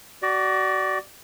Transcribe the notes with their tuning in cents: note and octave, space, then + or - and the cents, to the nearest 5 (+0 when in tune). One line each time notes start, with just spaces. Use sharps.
F#4 +30 D5 +0